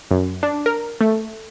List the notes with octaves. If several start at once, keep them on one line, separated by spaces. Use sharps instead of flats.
F#2
D4
A#4
A3